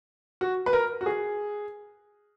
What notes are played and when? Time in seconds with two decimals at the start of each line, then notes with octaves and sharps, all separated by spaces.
0.41 F#4
0.66 B4
0.73 A#4
1.01 F#4
1.06 G#4